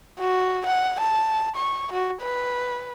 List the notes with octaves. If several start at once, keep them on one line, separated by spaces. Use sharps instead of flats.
F#4
F#5
A5
C#6
F#4
B4